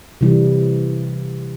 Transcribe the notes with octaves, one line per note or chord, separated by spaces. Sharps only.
C3 E3 G3